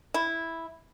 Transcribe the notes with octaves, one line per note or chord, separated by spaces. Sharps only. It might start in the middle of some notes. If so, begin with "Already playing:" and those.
E4